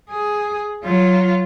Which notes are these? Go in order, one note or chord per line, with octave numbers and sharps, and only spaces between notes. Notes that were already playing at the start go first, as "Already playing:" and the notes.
G#4
F#3 F4